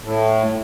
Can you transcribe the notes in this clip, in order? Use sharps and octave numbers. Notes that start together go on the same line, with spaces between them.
A2